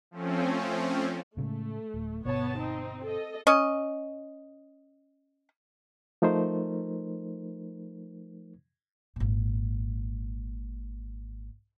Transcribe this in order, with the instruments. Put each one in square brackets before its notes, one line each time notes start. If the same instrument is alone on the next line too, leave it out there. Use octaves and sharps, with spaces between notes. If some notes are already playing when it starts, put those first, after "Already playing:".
[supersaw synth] F3 A3 C4 C#4
[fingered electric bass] A2 C#3 G#3 [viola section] A3
[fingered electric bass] D1
[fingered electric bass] G1 B2 [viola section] B3 C#5 A5
[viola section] C4 D#4
A4 D#5
[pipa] C#4 D#5
[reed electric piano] F3 A3 D#4 A#4 C5
[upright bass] G#1 A#2